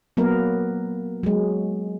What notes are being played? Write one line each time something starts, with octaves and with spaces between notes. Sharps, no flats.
F#3 A#3 B3 A#4
F#3 G#3